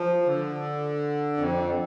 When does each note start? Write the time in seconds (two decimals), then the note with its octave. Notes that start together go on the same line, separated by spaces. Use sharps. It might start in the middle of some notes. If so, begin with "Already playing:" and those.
Already playing: F3
0.26 D3
1.37 F2